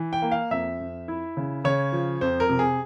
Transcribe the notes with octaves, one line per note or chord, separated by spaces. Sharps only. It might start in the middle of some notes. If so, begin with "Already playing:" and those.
Already playing: E3
G5
A#3
F5
F2 E5
F2
E4
C#3
C#3 C#5
F3
F2 C5
A#4
C3
G#4